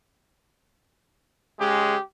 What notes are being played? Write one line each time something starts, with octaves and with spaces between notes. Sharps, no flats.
C#3 G#3 G4